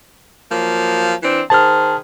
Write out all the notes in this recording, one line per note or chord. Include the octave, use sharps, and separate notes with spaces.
F3 F#3 A#3
E3 C4 D4
D#3 G#4 C5 A5 F6